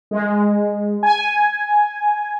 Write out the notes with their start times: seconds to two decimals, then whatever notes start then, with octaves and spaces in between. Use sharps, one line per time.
0.11 G#3
1.03 G#5